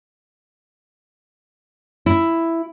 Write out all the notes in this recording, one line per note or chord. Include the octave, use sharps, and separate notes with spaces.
E4